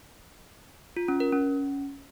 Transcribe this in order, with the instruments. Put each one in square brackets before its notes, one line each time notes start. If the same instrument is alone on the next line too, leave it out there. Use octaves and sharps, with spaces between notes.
[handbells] F4
C#4
A#4
C#4